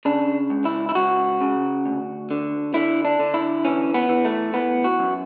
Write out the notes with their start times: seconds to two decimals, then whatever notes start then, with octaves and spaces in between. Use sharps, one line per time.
0.05 C#3 D4
0.50 C#2
0.65 E4
0.89 E4
0.95 C#2 F#4
1.41 C#3
1.86 D2
2.31 D3
2.74 D3 E4
3.05 D4
3.19 D3
3.34 E4
3.65 E3 C#4
3.94 B3
4.09 E3
4.25 A3
4.54 E3 B3
4.84 F#4
4.99 F#2